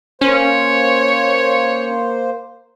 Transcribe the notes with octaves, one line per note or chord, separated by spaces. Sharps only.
A#3 C#4 C5 C#5